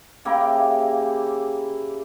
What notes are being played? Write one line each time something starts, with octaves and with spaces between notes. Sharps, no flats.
C#3 A#3 E4 G4